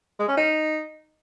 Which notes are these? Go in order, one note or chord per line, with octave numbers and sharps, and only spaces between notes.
G#3
C#4
D#4